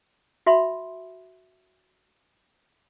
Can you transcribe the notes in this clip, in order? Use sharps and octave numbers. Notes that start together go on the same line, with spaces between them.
F#4 E5 B5 C6